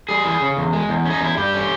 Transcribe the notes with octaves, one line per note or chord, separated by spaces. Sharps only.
G3 G#4
E3
C#3
E2
G#3
E2
C#4
D#4
E2 E4
G2 G4
C#4